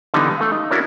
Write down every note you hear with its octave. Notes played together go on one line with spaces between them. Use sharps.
D3 E3 G3 B3 D#4
A3 F5
D#4
C#4 D4 E4 F#4 A#4